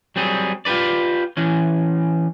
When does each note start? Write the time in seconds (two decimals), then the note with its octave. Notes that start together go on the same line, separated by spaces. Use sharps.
0.16 F#3 G3 C4 G#4
0.65 F4 G4 A#4 B4 D5
1.37 E3 C#4